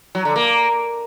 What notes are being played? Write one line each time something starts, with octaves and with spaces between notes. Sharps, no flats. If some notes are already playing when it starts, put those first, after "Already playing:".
F#3
D3
A#3